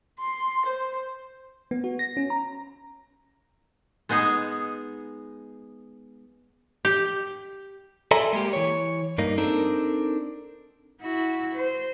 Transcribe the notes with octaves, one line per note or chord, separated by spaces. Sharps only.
C6
C5
B3
F#4
A#6
C#4
A#5
G#3 B3 D#4 G#4
G4
A4 D5 E5 G#5 A#5 C6
G#3 A#3 G4
E3 C#5
G2 A#3 D#4
C4 D4 D#4 A4 A#4
E4 F#4
C5